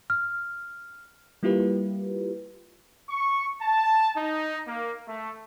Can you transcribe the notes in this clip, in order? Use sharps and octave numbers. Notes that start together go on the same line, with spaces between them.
F6
G3 A#3 E4 F4 G4 B4
C#6
A5
D#4
A#3
A3